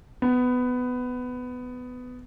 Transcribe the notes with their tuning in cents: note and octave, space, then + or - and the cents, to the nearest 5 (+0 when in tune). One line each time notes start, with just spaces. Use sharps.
B3 +15